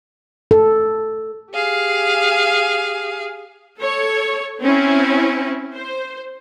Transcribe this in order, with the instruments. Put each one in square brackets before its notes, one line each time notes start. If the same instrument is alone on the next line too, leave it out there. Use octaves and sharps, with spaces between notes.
[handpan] A4
[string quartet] G4 G#4 F5
[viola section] A4 C#5
C4 C#4 E4
C5